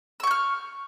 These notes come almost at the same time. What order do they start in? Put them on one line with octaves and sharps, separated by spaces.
E6 C#6 G6 F6